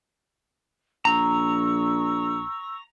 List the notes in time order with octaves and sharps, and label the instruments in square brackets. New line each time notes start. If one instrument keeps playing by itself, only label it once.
[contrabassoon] A#1 [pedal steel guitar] A#5 [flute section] C#6 E6